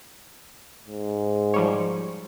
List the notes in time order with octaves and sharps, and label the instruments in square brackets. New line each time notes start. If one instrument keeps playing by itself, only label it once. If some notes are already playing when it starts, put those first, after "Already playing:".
[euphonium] G#2
[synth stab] F3 G3 C#5